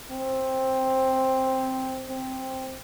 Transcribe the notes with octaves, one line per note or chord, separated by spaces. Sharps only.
C4
C4